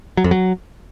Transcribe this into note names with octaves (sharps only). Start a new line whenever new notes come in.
F#3
F2
F#3